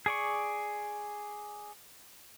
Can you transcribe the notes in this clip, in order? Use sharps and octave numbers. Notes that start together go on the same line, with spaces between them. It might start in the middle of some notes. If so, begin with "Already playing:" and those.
G#4 D5 C#6